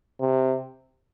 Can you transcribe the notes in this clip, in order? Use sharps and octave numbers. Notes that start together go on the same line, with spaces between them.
C3